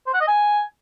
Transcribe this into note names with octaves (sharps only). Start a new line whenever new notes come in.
C5
F#5
D#5
G#5